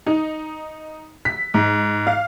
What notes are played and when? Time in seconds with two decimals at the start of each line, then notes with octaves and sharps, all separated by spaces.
0.06 D#4
1.25 B6
1.54 G#2
2.07 F5